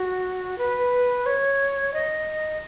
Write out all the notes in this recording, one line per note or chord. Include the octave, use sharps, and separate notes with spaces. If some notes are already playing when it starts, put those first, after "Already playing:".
Already playing: F#4
B4
C#5
D#5